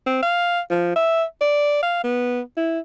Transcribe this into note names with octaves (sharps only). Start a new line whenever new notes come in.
C4
F5
F3
E5
D5
F5
B3
E4